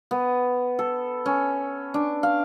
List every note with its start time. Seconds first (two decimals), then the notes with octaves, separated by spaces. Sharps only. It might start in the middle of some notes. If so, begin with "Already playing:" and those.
0.11 B3
0.79 A4
1.26 C#4
1.94 D4
2.23 F5